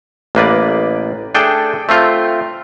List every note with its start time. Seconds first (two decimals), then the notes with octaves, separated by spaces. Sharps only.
0.35 A1 A#3 B4 D5
1.34 A3 D4 G#4 A4 G5
1.89 A3 C4 F4